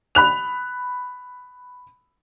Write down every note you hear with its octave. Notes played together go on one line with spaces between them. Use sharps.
B5 F#6 F7